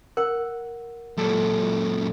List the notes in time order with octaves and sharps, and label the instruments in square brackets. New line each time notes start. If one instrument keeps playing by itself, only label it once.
[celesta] A#4 [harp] F#5
[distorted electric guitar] F#2 A#2 [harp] A4